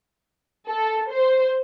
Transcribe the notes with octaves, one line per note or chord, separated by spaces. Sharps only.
A4
C5